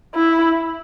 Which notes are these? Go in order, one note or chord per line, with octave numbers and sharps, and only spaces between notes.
E4